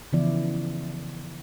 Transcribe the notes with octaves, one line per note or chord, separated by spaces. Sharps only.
C#3 E3 F3 B3 E4 D5